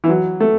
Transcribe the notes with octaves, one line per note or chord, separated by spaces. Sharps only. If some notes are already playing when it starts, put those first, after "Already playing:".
E3
F#3
A3